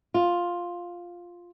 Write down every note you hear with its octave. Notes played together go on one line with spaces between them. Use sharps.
F4